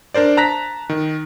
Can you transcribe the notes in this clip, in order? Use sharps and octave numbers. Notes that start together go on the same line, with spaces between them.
D4 A#4 C5 D5
A5 A#5 F#6 A#6 B6
D#3